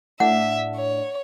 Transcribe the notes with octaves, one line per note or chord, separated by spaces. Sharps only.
A2 D4 E5 F#5
C#5